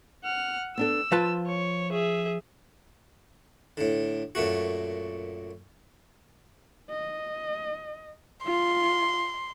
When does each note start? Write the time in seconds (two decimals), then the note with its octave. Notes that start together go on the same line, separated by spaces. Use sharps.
0.23 F#5 F6
0.78 B3 D4 A4 E6
1.12 F3 F4 B4 A5
1.47 C#5
1.92 G#4 E5
3.77 A2 D3
4.35 F#2 A#2 A3 F#4
6.90 D#5
8.45 F4 C6